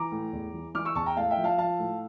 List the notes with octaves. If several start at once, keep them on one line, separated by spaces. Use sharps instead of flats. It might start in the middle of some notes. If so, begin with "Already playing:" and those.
Already playing: E3 A#5 D6
A2
E2
E3
E3 D6 F6
C#6 E6
E2 A5 C#6
G5 A#5
A2 F5 A5
E5 G5
F3
F5 A5
F3 F5 A5
A2